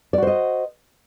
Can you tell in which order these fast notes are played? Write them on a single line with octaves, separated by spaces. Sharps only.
D5 F#4 C5 D#5